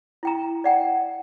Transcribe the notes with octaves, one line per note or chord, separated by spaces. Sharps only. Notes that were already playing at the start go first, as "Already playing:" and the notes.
E4 G5 A#5
D5 F#5 G5